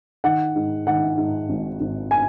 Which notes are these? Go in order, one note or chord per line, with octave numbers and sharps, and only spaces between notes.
D#3 F#5
G#2
D#3 F#5
G#2
G#1
G#1
G#5